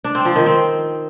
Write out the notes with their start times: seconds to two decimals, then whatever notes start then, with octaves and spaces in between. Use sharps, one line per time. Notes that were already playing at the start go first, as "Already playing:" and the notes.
0.04 D4
0.15 C4
0.25 F3
0.36 D#3
0.46 C4